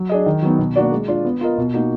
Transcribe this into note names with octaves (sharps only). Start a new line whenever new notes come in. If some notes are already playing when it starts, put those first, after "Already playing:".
Already playing: F#3
D4 G#4 D#5
D#3
F#3 B3 D#4
B2
A#3 D4 F#4 D5
G#3
D4 F4
B3
F4 A#4 D#5
B2
A#3 D#4 F#4